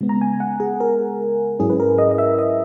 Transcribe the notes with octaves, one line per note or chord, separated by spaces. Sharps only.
C#3 G#3 B3
A#5
G#5
F#5
G#4
A#4
G#2 F#3 C#4 E4 G#4
B4
A#4
D#5
D#5
E5
D#5